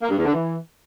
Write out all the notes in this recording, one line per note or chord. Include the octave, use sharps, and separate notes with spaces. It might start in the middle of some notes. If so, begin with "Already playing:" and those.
A#3
G2
E2
D3
E3